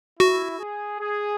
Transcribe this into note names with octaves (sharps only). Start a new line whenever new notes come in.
E4 F#4
G#4
G#4